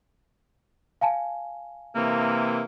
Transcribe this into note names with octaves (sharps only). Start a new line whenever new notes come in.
F5 G#5 A5
C3 E3 A#3